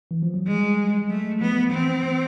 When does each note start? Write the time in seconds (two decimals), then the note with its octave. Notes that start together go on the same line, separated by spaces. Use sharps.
0.11 E3
0.23 F3
0.34 F#3
0.46 G3 G#3
1.09 F#3 A3
1.41 F3 B3
1.71 E3 C4
2.03 E3